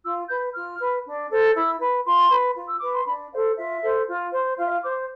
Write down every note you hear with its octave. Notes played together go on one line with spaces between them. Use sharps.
F4 E6
B4 G6
F4 F6
B4
D4
A4 C5
E4 E6
B4
F4 C6
B4
F4
E6
B4 D6
C6
D4 B5
A4 C5 F5
F4 E5
A4 C5
F4
C5
F4 F5
E5
F5
C5 D6